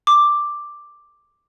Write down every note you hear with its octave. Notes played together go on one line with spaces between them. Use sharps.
D6